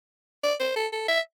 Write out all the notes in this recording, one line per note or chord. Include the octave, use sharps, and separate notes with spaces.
D5
C5
A4
A4
E5